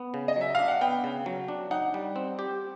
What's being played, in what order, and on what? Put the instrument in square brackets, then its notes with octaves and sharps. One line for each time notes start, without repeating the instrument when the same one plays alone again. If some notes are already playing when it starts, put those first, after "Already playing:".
Already playing: [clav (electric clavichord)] B3
C#3
[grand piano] D#5
[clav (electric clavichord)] F#3 [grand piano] E5
[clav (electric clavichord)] D4 [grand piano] F5
[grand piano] F#5
[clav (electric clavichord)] B3 [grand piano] G5
[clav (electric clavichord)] C#3
F#3
D4
[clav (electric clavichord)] D#4 [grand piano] F#5
[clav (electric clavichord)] G3
C4
G4